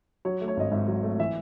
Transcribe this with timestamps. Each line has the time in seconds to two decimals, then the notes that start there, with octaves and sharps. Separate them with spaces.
0.25 F#3 C#5
0.41 A3
0.48 C#5
0.57 G#1 D#5
0.72 G#2 E5
0.88 F#3
1.03 A3
1.19 E3 E5